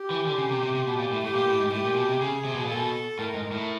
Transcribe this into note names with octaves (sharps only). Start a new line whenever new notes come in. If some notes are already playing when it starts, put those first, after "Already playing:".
Already playing: G4
E3
D3
C#3
C3
C3
C3
B2
A#2
A2
A2 G4
A#2
A2
G#2
A2 G4
A#2
B2
C3
C#3 G#4
C3
B2
A#2 A4
B2
A2 A#4
G#2
A2